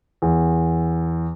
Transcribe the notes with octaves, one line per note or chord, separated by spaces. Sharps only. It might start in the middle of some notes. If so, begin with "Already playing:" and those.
E2